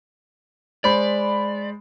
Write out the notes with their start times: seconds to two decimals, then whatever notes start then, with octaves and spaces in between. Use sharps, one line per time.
0.84 G#3 C5 D5 B5